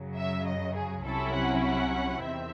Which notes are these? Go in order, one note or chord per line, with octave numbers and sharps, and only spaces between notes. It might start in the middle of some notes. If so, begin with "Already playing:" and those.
Already playing: F#2 C#3 F#3
E5
D#5
G#4
C2 C3 F#3 C#4 E4 A4
F#5
F#5
E2 D#3 C4 E5